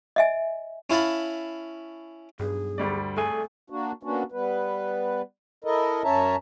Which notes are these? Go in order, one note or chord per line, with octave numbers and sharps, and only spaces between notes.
D#5 E5 G#5
C#4 E4 F5 A5 B5
B1 G2 G#4
D2 G3 D5
C2 A3 G#4 A4 G#5
A#3 D4 F#4
A#3 B3 C#4 D4 F#4
G3 B3 B4
E4 A4 A#4 D#5
F#2 C#4 C#5 E5 A5 A#5